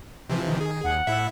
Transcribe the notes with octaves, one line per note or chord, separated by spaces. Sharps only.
C3 E3 F3
D#3
G#4
D#2 F#5
A2 E4 E5